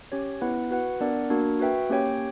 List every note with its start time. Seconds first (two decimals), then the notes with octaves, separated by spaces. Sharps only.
0.12 C#4 G4 C#5
0.41 B3 E4 B4 F#5
0.71 F#4 B4 F#5
1.00 B3 D4 A#4 D5 F#5
1.30 A#3 D4 F#4 A#4
1.59 F#4 B4 E5 G5
1.89 A#3 C#4 G4 C#5 G5